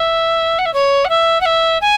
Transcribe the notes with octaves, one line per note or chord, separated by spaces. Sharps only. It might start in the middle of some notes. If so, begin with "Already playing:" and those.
Already playing: E5
F#5
E5
C#5
F#5
E5
F#5
E5
G#5